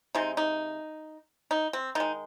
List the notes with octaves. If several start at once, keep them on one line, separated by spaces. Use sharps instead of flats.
C3 G#3 D#4
D#4
D#4
C4
D#3 G#3 D#4